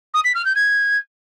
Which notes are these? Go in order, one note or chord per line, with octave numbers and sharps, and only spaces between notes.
D#6
B6
F6
G6
G#6